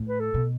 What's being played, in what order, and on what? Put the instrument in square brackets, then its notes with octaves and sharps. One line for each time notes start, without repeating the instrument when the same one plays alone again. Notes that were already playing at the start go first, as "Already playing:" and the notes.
Already playing: [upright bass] A2
[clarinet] B4
A4
[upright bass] B2